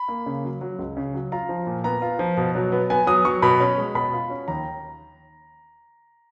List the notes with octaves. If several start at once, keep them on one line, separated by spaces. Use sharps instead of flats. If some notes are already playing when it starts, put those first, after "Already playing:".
Already playing: B5
A#3
C#3
F#3
F#3
C#2
C#3
F#3
F4 A#5
F3
A#2
B3 A#5
F4
F3
B2
F#3
B3
B3 G#5
F#3 D#6
F#3 C#6
B2 B5
C#4
G#3
B2 B5
F4
C#4
D#2 A#5